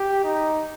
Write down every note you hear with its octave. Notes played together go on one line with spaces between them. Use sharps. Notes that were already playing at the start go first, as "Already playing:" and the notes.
Already playing: G4
D#4